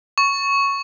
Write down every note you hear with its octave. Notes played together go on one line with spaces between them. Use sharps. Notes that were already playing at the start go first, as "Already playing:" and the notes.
C#6